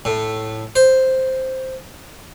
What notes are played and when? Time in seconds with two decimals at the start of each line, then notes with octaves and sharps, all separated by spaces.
0.05 A2
0.76 C5